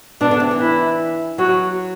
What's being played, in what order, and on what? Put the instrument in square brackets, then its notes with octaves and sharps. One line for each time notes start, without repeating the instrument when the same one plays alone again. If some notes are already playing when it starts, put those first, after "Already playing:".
[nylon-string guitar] B2 [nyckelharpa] D4
[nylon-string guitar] D3
C3
E3
[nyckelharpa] E4
[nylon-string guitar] F#3 [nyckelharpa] F#4